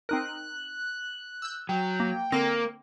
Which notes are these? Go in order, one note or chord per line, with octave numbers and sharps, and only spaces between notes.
C4 D#4 A#4 F#6
E6 G6
F#3 G5
A#3
D3 A#3 C4 A#6